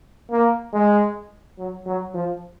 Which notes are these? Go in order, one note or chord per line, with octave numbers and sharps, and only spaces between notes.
A#3
G#3
F#3
F#3
F3